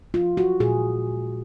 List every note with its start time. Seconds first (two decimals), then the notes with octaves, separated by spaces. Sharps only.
0.14 F4
0.37 F#4
0.60 A#2 G#3 G#4